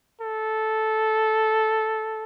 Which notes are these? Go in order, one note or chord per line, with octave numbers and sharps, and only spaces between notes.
A4